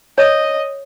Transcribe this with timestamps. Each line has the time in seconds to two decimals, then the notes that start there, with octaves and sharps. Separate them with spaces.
0.18 C#5 D#5